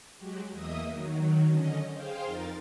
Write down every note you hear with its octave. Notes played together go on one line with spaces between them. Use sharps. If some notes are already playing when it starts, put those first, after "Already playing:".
F#3 G#3 F#4 G4
E2 A#3 D#5 E5 D#6
D#3 F#3
D3 C#4 D#5
G#4 C5 F5 G5
F2 D#4 A#4 A6